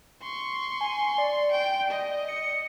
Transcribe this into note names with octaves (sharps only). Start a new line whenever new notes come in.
C6 C#6
G#5
D5
G5
D#5
C#7